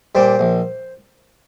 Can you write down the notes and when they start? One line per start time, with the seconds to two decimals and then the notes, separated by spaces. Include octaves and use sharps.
0.15 A#2 G3 C5
0.39 A#1